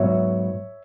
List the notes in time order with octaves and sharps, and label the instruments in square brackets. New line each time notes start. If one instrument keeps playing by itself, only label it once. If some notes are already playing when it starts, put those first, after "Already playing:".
Already playing: [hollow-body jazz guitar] G#2 F#3 B3 F#4 [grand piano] C#5 E5